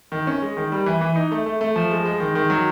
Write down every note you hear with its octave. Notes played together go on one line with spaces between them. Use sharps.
D#3
C#4
G#3
D#3
G3
E3
E3
D#4
A3
A3
A3
F3
G#3
G#3
D#3
D#3
F#3